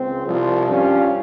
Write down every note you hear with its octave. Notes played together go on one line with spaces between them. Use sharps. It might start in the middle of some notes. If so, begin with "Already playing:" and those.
Already playing: C#2 C4
C2 C3 F3
G2 G3 C#4 F4